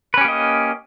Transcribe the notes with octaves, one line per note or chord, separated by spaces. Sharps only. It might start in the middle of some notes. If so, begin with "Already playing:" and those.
A#3 C#4 G4 B4 D#5